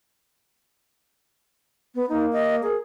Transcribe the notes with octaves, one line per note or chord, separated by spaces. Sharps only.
B3
A#3 D#4
D#5
G#4 A#4